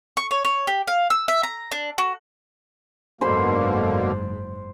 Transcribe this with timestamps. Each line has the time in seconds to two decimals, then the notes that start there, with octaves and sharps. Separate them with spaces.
0.17 C#6
0.31 C#5
0.45 C#5
0.67 G4
0.87 F5
1.10 E6
1.28 E5
1.43 A#5
1.72 D4
1.98 F#4
3.21 F#1 G#2 B2 D3 A#3 C5 B5 C6